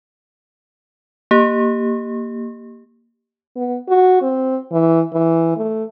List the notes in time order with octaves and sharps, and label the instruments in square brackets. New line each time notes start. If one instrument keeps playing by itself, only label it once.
[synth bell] A#3 G4
[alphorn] B3
F#4
C4
E3
E3
A3